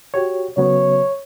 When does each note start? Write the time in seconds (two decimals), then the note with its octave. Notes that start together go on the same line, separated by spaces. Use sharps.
0.14 F#4 G4 C#5
0.57 C#3 F#3 B3 C#5